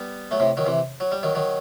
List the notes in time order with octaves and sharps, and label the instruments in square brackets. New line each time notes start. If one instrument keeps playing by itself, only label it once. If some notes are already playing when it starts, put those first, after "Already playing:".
Already playing: [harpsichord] G3 B3
F#3 A3
A2 C3
D#3 F#3
C3 E3
F#3
G3
D#3 F#3
D#3 F#3